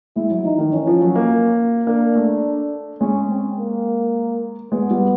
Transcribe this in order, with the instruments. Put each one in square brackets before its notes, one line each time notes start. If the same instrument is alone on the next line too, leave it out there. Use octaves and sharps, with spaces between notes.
[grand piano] G#3 [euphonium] E4
[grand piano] F#3
[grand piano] E3 [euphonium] D#4
[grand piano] D#3
[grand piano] E3 [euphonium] C#4
[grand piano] F3
F#3
A#3
[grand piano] A#3 [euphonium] D4
[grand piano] A3
[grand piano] G#3 [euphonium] C#4
[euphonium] C4
A#3
[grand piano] G#3 [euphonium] B3
[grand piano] G3